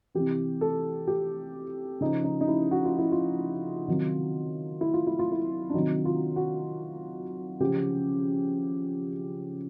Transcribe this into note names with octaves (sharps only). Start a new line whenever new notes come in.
C3 E3 G4
A4
G4
C#3 F3 D#4
D#4
D#4
E4
F#4
F4
E4
F4
C3 D#3 F#3
E4
F4
E4
F4
E4
D4
C3 D#3 F#3 D#4
F4
F#4
C#3 F3 G4